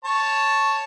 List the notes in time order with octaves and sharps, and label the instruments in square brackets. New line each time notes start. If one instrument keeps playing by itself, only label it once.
[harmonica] C#5 A5